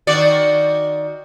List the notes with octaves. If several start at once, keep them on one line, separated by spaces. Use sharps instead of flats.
D#3 F#4 D5